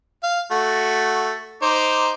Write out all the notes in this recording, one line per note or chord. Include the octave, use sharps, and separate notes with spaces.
F5
A3 F#4
D#4 C5 D6